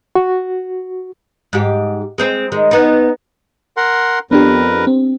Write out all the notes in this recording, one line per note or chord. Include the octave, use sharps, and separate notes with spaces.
F#4
G#2 G4
G#3 C4 C5
D#3 G#3
B3 D#4
A#4 F#5 C6
F2 B3 D4 G4 A#4 B4
C4